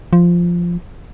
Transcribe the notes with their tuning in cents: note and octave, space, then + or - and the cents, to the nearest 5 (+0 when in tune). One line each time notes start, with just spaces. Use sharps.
F3 -5